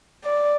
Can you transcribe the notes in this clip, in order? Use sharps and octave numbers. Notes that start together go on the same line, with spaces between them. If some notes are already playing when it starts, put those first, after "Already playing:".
D5